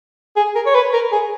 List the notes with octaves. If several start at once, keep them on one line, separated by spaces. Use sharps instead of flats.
G#4
A#4
C#5
B4
A#4
G#4